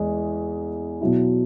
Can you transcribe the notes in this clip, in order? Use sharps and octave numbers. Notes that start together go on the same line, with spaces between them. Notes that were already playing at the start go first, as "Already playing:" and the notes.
Already playing: E2 E3 G#3
B2 F#3 E4